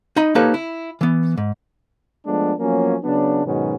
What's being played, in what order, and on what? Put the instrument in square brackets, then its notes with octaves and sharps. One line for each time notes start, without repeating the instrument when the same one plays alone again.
[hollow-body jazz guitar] D#4 D#5 B5
A#3 D#4 G4 A4 B4 C#5
E4
E3 B3
G#2
[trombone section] F3 G#3 A3 B3 D4
F3 F#3 A#3 B3 C#4
C#3 F#3 B3 D4
G#2 B2 D#3 F#3 B3 C#4